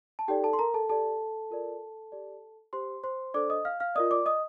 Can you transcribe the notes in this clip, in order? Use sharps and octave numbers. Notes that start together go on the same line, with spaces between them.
A5
D#4 G4 A4 D5 G5
A4 A5
C6
A#4 A#5
A4 A5
G4 A4 D5 A5
F4 A#4 D5
G4 D5
G4 C5 C6
C5 C6
D4 A4 C5 D5 D6
D#5 D#6
F5 F6
F5 F6
F4 A#4 D5 D#5 D#6
D5 D6
D#5 D#6